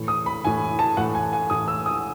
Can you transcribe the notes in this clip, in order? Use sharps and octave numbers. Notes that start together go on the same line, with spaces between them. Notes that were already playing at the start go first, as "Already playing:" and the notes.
Already playing: A2 E3
D#6
B5
A2 E3 G#5
A5
A2 E3 F#5
G#5
G#5
A2 E3 D#6
E6
D#6